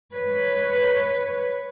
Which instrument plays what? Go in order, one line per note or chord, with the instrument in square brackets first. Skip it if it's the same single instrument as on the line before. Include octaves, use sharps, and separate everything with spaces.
[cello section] B4 C#5